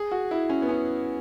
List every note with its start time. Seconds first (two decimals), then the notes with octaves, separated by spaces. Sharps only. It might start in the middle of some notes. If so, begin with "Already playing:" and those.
Already playing: G#4
0.11 F#4
0.31 E4
0.49 C#4
0.62 B3
0.69 C#4